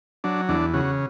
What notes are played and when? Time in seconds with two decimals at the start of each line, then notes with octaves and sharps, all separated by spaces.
0.24 F#3 D4
0.49 E2 D4
0.74 C#3 F#4